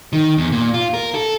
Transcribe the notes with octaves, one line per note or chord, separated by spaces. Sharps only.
D#3
E2
A#2
F4
A#4
A4